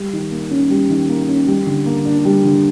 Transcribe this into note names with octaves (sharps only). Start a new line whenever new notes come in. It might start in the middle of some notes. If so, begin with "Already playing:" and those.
Already playing: G3
D#3
A#3
C#4
G3
D#3
A#3
C#4
G3
D3
A#3
D4
G3
D3